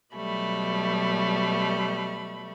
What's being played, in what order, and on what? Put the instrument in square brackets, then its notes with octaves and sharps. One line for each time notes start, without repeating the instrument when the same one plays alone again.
[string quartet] B2 F#3 G3 A3 B5